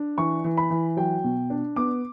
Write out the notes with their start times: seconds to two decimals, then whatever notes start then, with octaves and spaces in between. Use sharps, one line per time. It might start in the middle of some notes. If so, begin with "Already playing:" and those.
Already playing: D4
0.18 E3 C#6
0.44 E3
0.57 B5
0.71 E3
0.97 F#3 G5
1.24 B2
1.50 D4
1.76 B3 D6